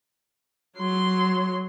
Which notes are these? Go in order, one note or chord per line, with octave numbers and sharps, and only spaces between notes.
F#3 C6